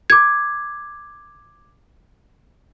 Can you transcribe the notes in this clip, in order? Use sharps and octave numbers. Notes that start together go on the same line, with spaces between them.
D6 G#6